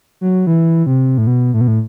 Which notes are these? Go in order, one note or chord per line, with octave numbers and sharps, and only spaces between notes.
F#3
E3
C3
A2
B2
A2
B2
A2